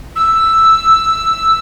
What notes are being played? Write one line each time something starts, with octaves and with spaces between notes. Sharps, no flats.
E6